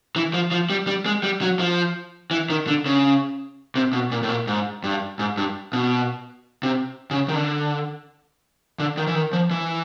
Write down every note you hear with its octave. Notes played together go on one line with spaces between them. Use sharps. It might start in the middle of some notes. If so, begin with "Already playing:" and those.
E3
F3
F3
G3
G3
G#3
G3
F#3
F3
E3
D#3
D3
C#3
C3
B2
A#2
A2
A#2
G#2
G2
G#2
G2
B2
C3
C#3
D#3
D3
D3
D#3
E3
D#3
F3
E3